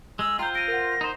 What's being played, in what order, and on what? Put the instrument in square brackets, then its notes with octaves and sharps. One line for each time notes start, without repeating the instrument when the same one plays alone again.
[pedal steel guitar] G#3 [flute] E6
[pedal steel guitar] F4 C5 [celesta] G5 [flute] A#5
[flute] A#6 [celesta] D7 D#7
[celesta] A#4 F#5
[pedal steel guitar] D#4 C5